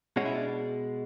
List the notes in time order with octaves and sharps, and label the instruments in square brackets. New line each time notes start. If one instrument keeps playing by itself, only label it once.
[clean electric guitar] B2 G#3 C#4 F#4
E4
D4